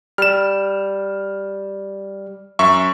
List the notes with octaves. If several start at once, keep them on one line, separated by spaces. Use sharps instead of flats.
G3 F6 E7
F#2 E5 C#6